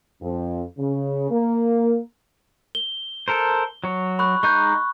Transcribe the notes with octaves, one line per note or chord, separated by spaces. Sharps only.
F2
C#3
A#3
G7
A4 A#4 C5
F#3 C#5
B5 C#6 F#6
G#3 D#4 C#6 F#6 G6